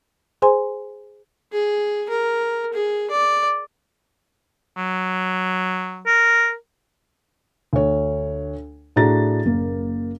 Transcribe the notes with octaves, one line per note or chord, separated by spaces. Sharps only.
G#4 C5 G#5 C6
G#4
A#4
G#4
D5
F#3
A#4
D2 C#5
A2 D4 F#4 G#4 A#5 A6
F#1 A#3